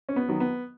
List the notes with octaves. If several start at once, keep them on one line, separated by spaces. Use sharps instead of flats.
C#4
B3
D#3 F#3
B3